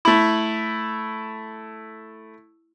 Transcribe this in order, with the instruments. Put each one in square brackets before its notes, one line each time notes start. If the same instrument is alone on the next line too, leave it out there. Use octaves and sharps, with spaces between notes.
[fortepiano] A3 E4